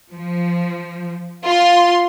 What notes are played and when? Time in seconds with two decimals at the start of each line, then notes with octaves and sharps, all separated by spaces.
0.12 F3
1.47 F4 C6